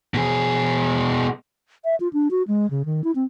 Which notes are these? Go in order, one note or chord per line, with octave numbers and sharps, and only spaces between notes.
B2 G#4
E5
F4
D4
F#4
G#3
C#3
D#3
E4
C4